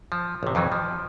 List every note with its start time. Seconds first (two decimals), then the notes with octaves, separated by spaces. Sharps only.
0.12 F3
0.43 A1 C3
0.55 F2 D#3 E3 F#3
0.72 F3